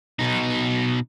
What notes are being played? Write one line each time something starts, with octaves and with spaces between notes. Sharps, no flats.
B2 D#4